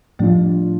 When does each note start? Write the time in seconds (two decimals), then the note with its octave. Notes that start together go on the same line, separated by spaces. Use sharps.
0.19 A2 F3 G3 A3 D4 F4